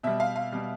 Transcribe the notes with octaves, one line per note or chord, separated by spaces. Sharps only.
B2 G3 E5
F5
F5
B2 G3